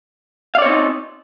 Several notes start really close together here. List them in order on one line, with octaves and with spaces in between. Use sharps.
F5 D5 C#5 C4 D#4